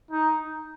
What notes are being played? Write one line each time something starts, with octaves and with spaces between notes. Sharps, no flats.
D#4